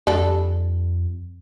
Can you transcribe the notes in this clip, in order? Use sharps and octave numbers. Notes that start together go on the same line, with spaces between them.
F2 G3 D4 A4